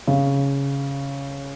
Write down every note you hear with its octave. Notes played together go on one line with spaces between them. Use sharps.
C#3